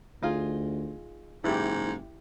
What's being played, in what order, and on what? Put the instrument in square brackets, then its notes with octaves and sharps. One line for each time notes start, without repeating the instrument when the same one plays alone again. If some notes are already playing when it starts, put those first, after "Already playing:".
[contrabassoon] D2 [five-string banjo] D#4 F4 G#4
[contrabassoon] F#1 [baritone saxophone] G#2 [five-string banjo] E3 [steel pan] E4 G4